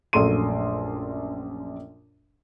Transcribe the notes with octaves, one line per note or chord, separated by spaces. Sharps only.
A#1 F#2 A3 D4 C6 D#7